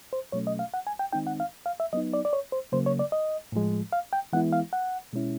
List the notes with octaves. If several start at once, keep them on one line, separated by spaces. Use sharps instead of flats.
C5
B2 F#3 A3 C#4 C#5
D#5
F5
F#5
G#5
G5
D#3 G#3 C4 D#4 G5
F#5
F5
F5
E5
F#3 B3 D#4 D#5
D5
D5
C#5
C5
C#3 F#3 A#3 C5
C#5
D5
D#5
A2 F3 G#3
F5
G5
E3 G#3 B3 E4 F#5
F5
F#5
B2 G#3 C#4 E4